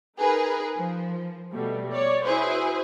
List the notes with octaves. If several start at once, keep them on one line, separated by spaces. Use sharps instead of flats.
D#4 G#4 A#4 B4
F3
B2 G3 A3
C#5 D5
E4 F#4 G#4 B4 C5